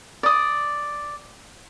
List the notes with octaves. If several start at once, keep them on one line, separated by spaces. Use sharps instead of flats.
D5 D#6